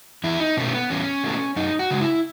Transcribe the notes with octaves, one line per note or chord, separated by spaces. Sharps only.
E2 E4
D#4
B2 A3 C#4
B3
E2 C#4
B2 A3
F#2 D#4
F#4
C#3 G#3
E4